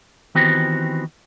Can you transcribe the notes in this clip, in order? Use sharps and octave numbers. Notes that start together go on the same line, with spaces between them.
D#3 E3 B3 C4 F#4 G4